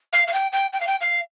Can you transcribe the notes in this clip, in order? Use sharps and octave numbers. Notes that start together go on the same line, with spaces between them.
F5
F5
G5
G5
G5
F5
G5
F5